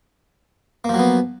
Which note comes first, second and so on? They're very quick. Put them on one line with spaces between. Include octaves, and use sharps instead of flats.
A#3 F3 F#3 B3